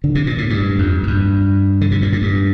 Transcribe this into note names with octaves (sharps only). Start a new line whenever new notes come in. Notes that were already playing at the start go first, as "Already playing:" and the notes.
D3
C3
A#2
A2
G2
F2
F2
G2
D3
C3
A#2
A2
G2